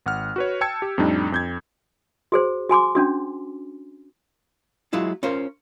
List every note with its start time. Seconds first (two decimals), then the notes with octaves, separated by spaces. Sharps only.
0.06 G#1 F#5 F6
0.36 F#4 B4 C#5
0.61 G5 A5 E6 G#6 C#7
0.82 G4
0.98 F2 A2 G3 D4 D#4
1.32 F2 G6 G#6
2.32 F#4 G#4 C5
2.70 F#4 G#5 C6 D6
2.95 C#4 D4 F#4
4.93 F#3 G#3 E4 F4
5.23 C#4 F4 A#4 C5